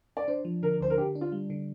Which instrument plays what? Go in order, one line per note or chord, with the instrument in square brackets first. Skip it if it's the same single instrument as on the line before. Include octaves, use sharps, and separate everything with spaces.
[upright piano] D5
[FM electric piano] D4 [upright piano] C5
[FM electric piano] F3
[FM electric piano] D3 [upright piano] A#4
[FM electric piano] D2 [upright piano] C5
[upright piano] A#4
[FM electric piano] D3 [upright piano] G4
[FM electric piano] D4
[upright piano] F4
[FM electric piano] G3
D3